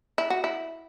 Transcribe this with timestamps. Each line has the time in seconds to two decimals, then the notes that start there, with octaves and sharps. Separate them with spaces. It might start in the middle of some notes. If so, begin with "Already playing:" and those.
0.18 E4
0.30 F#4
0.44 E4